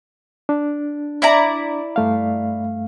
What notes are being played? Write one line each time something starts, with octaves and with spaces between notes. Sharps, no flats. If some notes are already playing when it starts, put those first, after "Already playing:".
D4
E4 D5 A#5
G2 A3 F5